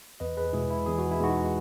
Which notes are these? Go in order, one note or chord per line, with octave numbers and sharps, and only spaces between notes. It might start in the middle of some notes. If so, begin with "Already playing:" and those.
E2 B4 D#5
G#4 B4
B2 G#3 E4 G#4
E4
E2 G#4
F#4
E4
B2 G#3 D#4 F#4